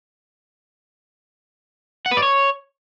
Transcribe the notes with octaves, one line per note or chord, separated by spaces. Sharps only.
F#5
B4
D5
C#5